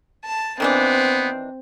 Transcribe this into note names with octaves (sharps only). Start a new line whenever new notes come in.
A5
D#3 E3 B3 C4 D4